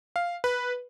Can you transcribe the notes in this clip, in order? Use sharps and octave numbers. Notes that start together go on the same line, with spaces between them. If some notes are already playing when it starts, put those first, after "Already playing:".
F5
B4